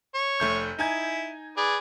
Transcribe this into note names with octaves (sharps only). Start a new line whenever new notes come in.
C#5
F1 A3 G6
D#4 E4 G#5 G#6
G#4 B4 D5